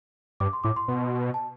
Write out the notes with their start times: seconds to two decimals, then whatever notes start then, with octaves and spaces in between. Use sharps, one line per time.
0.40 G2 D6
0.53 C6
0.64 A2 D6
0.76 C6
0.88 B2
1.34 A5